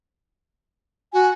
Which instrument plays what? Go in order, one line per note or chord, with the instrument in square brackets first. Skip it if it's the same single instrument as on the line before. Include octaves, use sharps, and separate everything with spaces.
[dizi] F#4 [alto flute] G#5